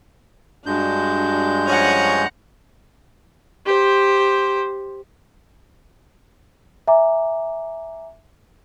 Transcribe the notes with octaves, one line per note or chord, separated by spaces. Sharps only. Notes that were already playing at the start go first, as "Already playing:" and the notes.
G2 G#3 D4 F#4 G6
F3 C#4 C#5 F#5 A#5
G4 C5
E5 G#5 A#5 D6